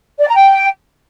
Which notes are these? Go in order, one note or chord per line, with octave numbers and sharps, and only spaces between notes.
D5
A#5
G5